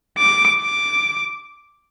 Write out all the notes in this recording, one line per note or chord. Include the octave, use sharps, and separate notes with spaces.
D6
D6